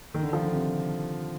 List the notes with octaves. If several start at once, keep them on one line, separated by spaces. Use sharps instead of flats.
D#3
D3
F3
D3
C3